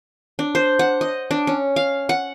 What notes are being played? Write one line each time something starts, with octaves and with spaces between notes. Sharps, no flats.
D4
C5
F#5
D#5
D4
C#4
F5
F#5